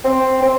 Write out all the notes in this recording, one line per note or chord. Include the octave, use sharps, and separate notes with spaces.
C4
C4